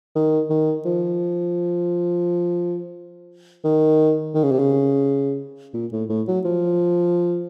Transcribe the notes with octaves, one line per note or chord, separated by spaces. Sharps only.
D#3
D#3
F3
D#3
D#3
C#3
C3
C#3
A#2
A2
A2
F#3
F3